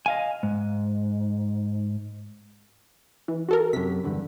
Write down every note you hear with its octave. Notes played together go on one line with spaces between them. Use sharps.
D#5 F5 G#5
G#2
E3
F#4 A4 A#4
F#2 C3 B6
E2 G2 D3